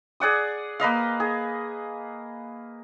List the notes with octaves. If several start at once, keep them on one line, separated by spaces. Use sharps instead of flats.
G#4 D5 F#5 D#6
A#3 B4 D#5 F5
G#4